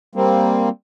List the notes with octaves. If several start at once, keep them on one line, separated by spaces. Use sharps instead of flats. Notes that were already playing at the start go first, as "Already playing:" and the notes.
G3 A#3 C4